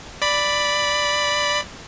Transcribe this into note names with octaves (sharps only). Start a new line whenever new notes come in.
D5 B5